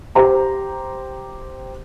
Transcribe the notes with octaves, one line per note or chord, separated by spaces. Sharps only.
G4 C5 A#5